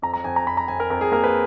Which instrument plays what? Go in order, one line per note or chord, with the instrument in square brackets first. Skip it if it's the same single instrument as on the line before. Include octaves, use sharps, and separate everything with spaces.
[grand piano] F2 A#5
A#5
F2 G#5
A#5
F2 B5
A#5
F2 G#5
A#4
F2 A#4
G#4
A#3 A#4
B4